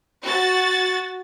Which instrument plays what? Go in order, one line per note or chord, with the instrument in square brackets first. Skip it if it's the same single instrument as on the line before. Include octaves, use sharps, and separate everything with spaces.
[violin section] F#4 A6